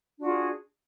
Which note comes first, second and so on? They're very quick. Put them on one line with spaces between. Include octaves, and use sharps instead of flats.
D4 F#4 F4 G#4